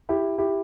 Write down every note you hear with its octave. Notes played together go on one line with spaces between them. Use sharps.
E4 G4
E4 G4